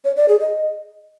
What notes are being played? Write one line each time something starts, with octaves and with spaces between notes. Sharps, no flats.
C#5
D5
G#4
D#5